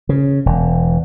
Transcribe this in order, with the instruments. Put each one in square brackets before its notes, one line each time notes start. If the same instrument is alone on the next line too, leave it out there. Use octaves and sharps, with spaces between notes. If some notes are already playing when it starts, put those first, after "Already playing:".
[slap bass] C#3
E1